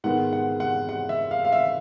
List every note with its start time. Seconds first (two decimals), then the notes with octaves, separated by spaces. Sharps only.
0.04 G#2 D#3 G#3 B3 F#5
0.33 F#5
0.60 F#5
0.89 F#5
1.09 E5
1.31 F5
1.45 F5
1.52 E5